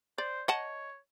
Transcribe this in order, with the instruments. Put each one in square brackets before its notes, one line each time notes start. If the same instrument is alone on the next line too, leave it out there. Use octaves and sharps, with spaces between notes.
[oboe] C5 [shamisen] D5
[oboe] C#5 [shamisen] D#5 F#5 A5